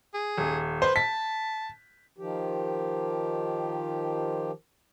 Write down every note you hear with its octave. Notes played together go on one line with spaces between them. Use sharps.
G#4
D#1
B4 C5
A5 B6
D#3 F3 G4